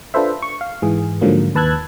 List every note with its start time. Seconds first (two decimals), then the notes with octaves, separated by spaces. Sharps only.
0.14 D4 F4 A4 B4 C5 E5
0.42 C#6
0.61 F5
0.82 G#2 E3 G#4
1.21 G#2 D3 F3 F#3 A#3
1.55 D#2 B4 A5 E6 F#6 G#6